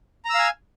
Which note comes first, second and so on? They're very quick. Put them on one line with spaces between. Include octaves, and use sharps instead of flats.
A#5 E6 F5 G#5